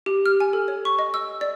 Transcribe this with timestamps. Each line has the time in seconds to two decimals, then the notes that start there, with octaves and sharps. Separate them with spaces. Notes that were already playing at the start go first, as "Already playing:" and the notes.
0.06 G4
0.26 F6
0.40 G#5
0.53 A4
0.68 C#5
0.85 C#6
0.99 D#5
1.14 E6
1.41 D5